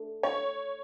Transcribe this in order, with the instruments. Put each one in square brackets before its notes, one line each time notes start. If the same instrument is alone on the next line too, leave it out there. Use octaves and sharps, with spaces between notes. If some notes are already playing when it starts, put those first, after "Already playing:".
Already playing: [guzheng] A3 D4
[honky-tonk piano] C#5